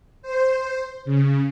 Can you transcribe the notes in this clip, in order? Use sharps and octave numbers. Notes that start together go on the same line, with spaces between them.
C5
C#3